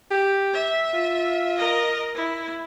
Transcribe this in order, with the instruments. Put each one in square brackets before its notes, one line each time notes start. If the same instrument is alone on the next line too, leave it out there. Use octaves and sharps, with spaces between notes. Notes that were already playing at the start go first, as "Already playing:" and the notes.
[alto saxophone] G4
[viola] E5
[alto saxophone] F4
[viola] A#4 D#5
E4